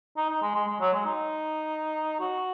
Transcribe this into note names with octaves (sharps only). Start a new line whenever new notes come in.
D#4
D#4
G#3
G#3
G#3
F#3
G#3
D#4
F#4